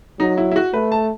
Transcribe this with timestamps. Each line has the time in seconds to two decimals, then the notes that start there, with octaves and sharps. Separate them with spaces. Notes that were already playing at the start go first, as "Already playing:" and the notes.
0.19 F#3 D#4
0.38 E4
0.51 E4
0.56 F#4
0.73 A3 B4
0.92 A5